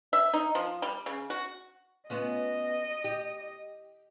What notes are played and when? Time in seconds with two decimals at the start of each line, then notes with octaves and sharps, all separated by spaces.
0.13 E5
0.33 D#4
0.55 F3
0.82 G3
1.06 C#3
1.30 F#4
2.10 B3 C#4 F4 D#5
3.04 G4